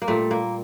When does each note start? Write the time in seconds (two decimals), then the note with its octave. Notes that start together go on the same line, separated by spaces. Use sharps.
0.02 A#3
0.08 A#2 G3 A3
0.31 A#3